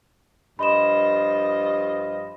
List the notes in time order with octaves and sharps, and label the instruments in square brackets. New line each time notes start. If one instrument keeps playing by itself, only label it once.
[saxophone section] G2 F3 D#5 [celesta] B5 C6 E7